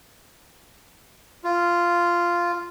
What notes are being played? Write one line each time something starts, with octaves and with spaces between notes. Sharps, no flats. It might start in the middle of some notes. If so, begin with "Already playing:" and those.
F4